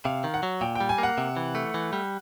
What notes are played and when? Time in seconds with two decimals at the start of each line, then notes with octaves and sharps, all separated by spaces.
0.05 C3 F5
0.24 D#3
0.34 F#5
0.43 F#3
0.61 A#2 G5
0.75 G5
0.80 G3
0.89 G#5
0.98 A#3
1.03 F#5
1.18 C3
1.37 E3
1.55 A3
1.74 E3
1.93 G3